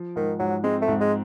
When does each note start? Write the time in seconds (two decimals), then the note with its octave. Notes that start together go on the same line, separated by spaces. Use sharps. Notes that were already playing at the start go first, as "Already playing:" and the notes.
Already playing: F3
0.16 G#2 D#3
0.39 G#2 F#3
0.64 G#3 C4
0.82 A3
0.88 G#2
1.00 G#3